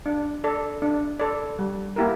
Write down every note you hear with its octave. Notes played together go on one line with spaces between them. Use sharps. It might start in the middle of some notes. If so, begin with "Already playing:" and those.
D4
A4 D5
D4
A4 D5
G3
A#3 E4 G4 A#4